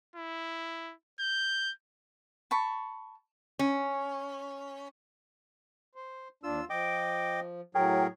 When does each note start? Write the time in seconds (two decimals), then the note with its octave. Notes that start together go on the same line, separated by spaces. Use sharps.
0.16 E4
1.20 G6
2.51 A5 B5 C#6
3.59 C#4
5.95 C5
6.43 D#2 D4 F4 E6
6.70 F3 D#5 G5 D6
7.75 A2 F#3 G#4 A#4 C#5 G5